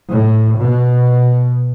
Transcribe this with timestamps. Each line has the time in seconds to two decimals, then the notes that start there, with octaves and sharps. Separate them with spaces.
0.10 A2
0.59 B2